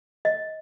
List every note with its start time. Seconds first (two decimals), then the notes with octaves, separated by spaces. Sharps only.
0.25 D#5